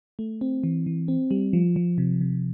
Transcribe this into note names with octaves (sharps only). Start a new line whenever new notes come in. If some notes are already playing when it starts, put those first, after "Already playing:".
A3
C4
E3
E3
C4
G3
F3
F3
C3
C3